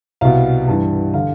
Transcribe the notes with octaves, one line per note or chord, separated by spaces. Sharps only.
C2 B2 F5
G2 E3
D3 F5